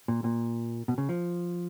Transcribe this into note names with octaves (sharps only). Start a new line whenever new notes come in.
A#2
A#2
B2
C#3
F3